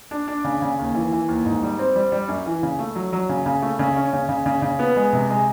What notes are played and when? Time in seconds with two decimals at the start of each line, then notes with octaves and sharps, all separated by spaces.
0.11 D4
0.28 D4
0.44 C#3
0.62 C#3
0.79 D#2
0.95 E3
1.13 E3
1.28 D#2
1.45 G#2
1.63 G3
1.79 C4
1.96 G3
2.12 G3
2.28 F#2
2.46 E3
2.63 C#3
2.79 A3
2.95 F#3
3.13 F#3
3.29 C#3
3.46 C#3
3.62 A3
3.79 C#3
3.96 C#4
4.13 C#3
4.29 C#3
4.46 C#3
4.62 C#3
4.79 B3
4.96 G#3
5.13 C3
5.30 G#3